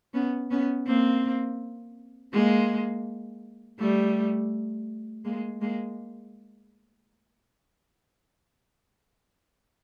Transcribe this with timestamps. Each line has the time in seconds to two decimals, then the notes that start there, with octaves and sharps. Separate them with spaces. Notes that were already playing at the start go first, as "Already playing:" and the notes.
0.14 B3 C#4
0.51 B3 C#4
0.86 A#3 C4
2.33 G#3 A#3
3.79 G3 A3
5.24 G#3 A#3
5.61 G#3 A#3